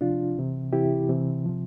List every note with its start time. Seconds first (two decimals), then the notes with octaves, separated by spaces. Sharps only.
0.01 C3 F3 D4 F4
0.37 C3 E3
0.73 C3 E3 E4 G4
1.09 C3 E3
1.45 C3 F3